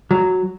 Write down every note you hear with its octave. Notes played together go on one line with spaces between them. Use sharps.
F#3